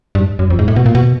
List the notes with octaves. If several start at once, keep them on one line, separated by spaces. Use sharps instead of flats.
G2
F#2
F2
G#2
A2
B2
A#2
B2